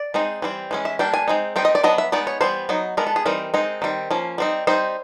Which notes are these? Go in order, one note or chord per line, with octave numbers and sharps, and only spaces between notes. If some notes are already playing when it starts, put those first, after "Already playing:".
Already playing: D5
G#3 C4 D#4
E3 G3 C4
E3 G#3 C#4
E5
G3 A#3 D4 G5
G#5
G#3 C4 D#4
G3 C4 D#4 G5
D#5
D5
F#3 B3 D4 D#5
E5
G#3 B3 D#4 D5
C#5
E3 G3 B3 C5
F#3 B3 D#4
G#3 B3 D4 A#4
A4
G#4
E3 G3 C4 D#4 A#4
G#3 C4 D#4
D#3 G3 C4
F3 A#3 C#4
G3 C4 D#4
G3 C4 D#4 C5